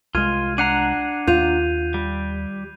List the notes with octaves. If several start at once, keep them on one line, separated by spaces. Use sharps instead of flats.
C2 G#3 F4 G#6 D#7
D4 F#5 A#5 F#6 C7 D#7
D#2 F4 G6 D#7 F7
G3